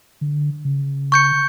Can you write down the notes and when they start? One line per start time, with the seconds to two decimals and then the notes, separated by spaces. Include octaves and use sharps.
0.21 D3
0.65 C#3
1.12 C#6 G6 C#7